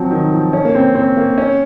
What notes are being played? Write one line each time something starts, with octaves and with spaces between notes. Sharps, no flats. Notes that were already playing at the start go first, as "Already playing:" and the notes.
Already playing: F3 F#3 C4
D#3
F3
C#4
A#3
C4
C4
A#3
C#4